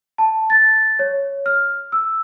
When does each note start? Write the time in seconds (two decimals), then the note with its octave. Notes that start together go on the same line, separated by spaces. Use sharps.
0.18 A5
0.50 A6
0.99 C#5
1.46 F6
1.92 E6